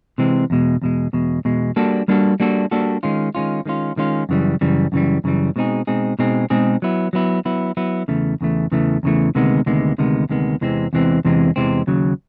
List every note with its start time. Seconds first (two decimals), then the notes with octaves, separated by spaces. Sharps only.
0.18 C3 E3 G#3 C4
0.50 E2 B2 G#3
0.82 E2 B2 G#3
1.13 E2 B2 G#3
1.45 E2 B2 G#3
1.76 G3 A#3 D4 F#4 A4
2.08 G3 A#3 D4 F#4 A4
2.40 G3 A#3 D4 F#4 A4
2.71 G3 A#3 D4 F#4 A4
3.03 D#3 G#3 C#4 F4
3.35 D#3 G#3 C#4 F4
3.66 D#3 G#3 C#4 F4
3.97 D#3 G#3 C#4 F4
4.29 F#2 C#3 E3 G3
4.61 F#2 C#3 E3 G3
4.92 F#2 C#3 E3 G3
5.24 F#2 C#3 E3 G3
5.56 B2 G#3 C4 D#4 G#4
5.87 B2 G#3 C4 D#4 G#4
6.19 B2 G#3 C4 D#4 G#4
6.50 B2 G#3 C4 D#4 G#4
6.82 F#3 B3 E4
7.13 F#3 B3 E4
7.46 F#3 B3 E4
7.77 F#3 B3 E4
8.08 E2 C#3 E3 A3
8.41 E2 C#3 E3 A3
8.72 E2 C#3 E3 A3
9.03 E2 C#3 E3 A3
9.35 D2 C3 D#3 G#3 B3
9.66 D2 C3 D#3 G#3 B3
9.98 D2 C3 D#3 G#3 B3
10.29 D2 C3 D#3 G#3 B3
10.61 E2 C3 E3 G#3 C4
10.93 E2 C3 E3 G#3 C4
11.25 E2 C3 E3 G#3 C4
11.56 E2 C3 E3 G#3 C4
11.87 D#2 C#3 F#3